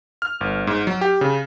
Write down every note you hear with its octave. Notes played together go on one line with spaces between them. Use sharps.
F6
G1
G#2
F#3
G4
C#3